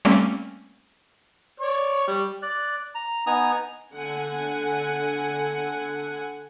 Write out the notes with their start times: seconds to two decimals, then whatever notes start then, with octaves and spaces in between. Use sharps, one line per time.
0.05 G3 A3 A#3 C4 C#4
1.60 C#5 D5 C#6
2.07 G3
2.42 D5 F#6
2.95 A#5
3.27 B3 D#4 G#5 A#5 D#6
3.95 D3 F#5 G#5